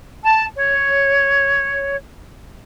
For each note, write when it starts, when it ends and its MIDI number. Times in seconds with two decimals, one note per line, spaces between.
0.23 0.45 81
0.56 1.96 73